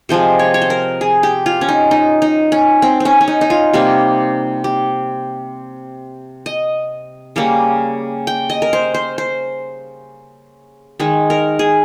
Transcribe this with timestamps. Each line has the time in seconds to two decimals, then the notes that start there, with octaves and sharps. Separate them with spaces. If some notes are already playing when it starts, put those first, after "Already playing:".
0.09 C3 F3 G#3 C5
0.39 C#5
0.54 C#5
0.62 C5
0.70 A#4
1.01 G#4
1.23 G4
1.46 F4
1.61 C#4
1.68 D#4
1.91 D#4
2.22 D#4
2.52 C#4
2.82 C4
3.00 C4 C#4
3.21 C#4
3.28 D#4
3.41 D#4
3.50 F4
3.73 C3 G3 A#3
4.64 G4
6.46 D#5
7.36 C#3 G3 A#3
8.27 G5
8.50 D#5
8.62 A#4
8.73 C5
8.94 C5
9.18 C5
11.00 D#3 G#3
11.30 A#4
11.59 G#4